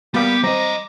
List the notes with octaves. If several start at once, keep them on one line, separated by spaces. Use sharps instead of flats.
G3 A#3 B3 G4 D6
G3 C4 D#5 A#5